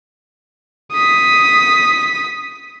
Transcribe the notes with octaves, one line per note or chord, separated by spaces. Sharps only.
D#6 B6